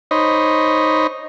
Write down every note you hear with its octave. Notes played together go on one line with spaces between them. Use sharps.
D#4 C5 C#5 D#5 B5